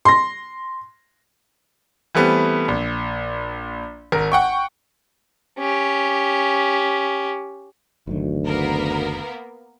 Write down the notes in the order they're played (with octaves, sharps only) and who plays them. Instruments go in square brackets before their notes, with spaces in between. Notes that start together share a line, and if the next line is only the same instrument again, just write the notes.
[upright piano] C6 A#6
[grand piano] E3 G3 A3 B3 C4
A#1
G#1 A#4
F#5 G5 C#6
[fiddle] C#4 G4
[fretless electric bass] F#1 D#3 F#3 [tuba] D2
[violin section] A#3 B3 A#4